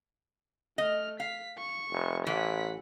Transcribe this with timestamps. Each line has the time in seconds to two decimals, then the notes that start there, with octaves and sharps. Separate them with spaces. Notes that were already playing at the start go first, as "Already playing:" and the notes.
0.78 A3 D#5 F6
1.20 F5 B6
1.58 C#6
1.92 F1
2.27 A1 E3 F#5 B6